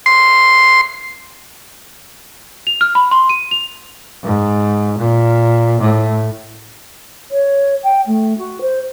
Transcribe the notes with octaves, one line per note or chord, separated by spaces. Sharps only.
C6
F7
F6
B5
C6
D#7
F7
G#2
A#2
A2
C#5
G5
A3
F#4
C5